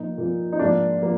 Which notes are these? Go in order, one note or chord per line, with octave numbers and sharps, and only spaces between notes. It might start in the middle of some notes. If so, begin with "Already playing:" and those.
Already playing: A#2 F3 A#3 D#4
A#2 F3 A#3
D#4
G#2 F3 A#3 D4
F3 A#3